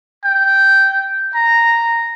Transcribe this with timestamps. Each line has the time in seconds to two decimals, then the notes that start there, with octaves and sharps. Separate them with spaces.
0.24 G5
1.35 A#5